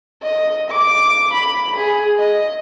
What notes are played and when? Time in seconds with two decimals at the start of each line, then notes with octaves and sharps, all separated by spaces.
0.23 D#5
0.71 D6
1.34 B5
1.77 G#4
2.19 D#5